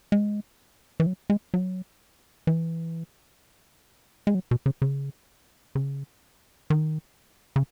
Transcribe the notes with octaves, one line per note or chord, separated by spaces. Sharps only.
G#3
E3
F#3
G#3
F#3
E3
G#3
F#3
B2
C#3
C#3
C#3
D#3
C#3